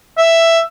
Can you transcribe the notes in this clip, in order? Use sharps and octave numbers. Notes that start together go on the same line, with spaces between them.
E5